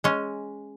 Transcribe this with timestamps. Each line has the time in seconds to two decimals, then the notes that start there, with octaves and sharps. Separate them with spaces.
0.04 G#3 C#4